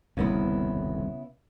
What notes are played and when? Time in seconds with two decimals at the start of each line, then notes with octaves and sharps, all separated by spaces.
0.17 D#1 C2 F2 C#3 B3 E4